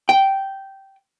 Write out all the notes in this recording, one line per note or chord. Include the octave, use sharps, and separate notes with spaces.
G5